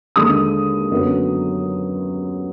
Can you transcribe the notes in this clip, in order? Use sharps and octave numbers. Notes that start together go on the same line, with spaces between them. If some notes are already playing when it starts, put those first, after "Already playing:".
D#2 D3 G#3 D#6
F#2 D3 F#3 B3